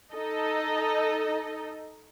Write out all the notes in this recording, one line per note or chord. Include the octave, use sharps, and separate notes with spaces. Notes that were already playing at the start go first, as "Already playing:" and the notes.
D#4 A4 D#5